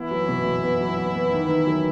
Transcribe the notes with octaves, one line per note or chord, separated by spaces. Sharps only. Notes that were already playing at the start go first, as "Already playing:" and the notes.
Already playing: E3 B3 E4
F#3
B2
B2
B3
F#3
B3
B3
D#3
D#3
F#3